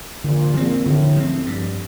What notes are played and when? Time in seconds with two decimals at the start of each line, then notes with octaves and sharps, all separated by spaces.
0.24 A#1 A#2 D3
0.54 A#1 A#2 F3 C4
0.85 A1 A2 D3
1.16 F3 C4
1.46 G2